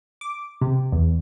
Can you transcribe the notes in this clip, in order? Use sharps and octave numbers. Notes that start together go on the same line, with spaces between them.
D6
C3
E2